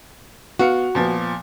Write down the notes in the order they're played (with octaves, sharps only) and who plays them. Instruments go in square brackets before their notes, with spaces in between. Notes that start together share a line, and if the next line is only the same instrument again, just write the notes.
[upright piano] B3 F5 C#7 [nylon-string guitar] F#4
[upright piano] A#2 F3 B3